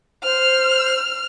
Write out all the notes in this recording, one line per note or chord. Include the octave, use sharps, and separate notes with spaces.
C5 F6